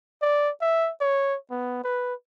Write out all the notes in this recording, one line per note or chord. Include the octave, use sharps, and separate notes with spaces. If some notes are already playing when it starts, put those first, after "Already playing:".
D5
E5
C#5
B3
B4